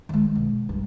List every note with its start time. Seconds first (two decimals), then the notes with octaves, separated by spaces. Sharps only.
0.09 D#3 G#3
0.35 B2
0.69 G2